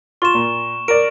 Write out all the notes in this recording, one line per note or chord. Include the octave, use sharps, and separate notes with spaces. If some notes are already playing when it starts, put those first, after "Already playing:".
F4 C#6 E7
A#2
A#4 D5 D7